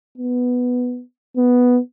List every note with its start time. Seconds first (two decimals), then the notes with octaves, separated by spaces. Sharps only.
0.18 B3
1.37 B3